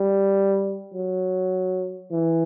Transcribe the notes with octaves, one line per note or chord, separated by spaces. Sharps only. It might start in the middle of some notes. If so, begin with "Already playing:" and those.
Already playing: G3
F#3
E3